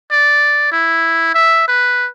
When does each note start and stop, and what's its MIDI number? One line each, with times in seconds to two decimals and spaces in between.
0.11 0.69 74
0.72 1.33 64
1.34 1.67 76
1.68 2.08 71